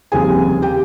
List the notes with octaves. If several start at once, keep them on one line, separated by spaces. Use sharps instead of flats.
F1 D#2 C#3 G3 C4 G#4 G#5
G4 G5